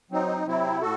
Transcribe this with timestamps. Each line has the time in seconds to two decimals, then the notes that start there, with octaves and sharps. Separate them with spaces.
0.11 F#3 C4 D#4
0.46 C3 F#3 C4 E4
0.81 A2 F#4 A4